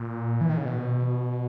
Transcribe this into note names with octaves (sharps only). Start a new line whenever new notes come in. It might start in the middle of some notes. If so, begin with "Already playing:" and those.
Already playing: A#2
E3
D#3
C#3
B2